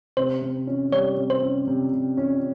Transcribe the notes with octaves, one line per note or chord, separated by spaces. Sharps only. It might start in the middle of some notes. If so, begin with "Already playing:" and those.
C3 C5
C3
C#4
G3 C#5
C3
C5
C#4
C3
C3
C#4